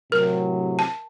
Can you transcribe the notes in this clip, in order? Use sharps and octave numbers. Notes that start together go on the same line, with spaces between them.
A2 C3 F#3 A#4
A5